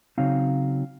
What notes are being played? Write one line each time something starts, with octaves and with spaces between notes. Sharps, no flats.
C#3 F#3 C4 D#4 F5